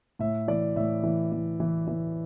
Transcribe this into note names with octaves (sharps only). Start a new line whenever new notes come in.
A2 E5
E3 D5
A2 E5
E3
E3
E3
E3